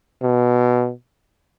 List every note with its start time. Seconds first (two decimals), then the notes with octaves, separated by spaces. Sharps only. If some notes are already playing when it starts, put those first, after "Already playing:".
0.23 B2